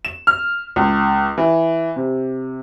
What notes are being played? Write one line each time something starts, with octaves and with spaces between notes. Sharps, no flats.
E7
F6
C#2
E3
C3